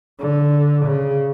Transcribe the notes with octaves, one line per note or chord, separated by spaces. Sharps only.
D3
C#3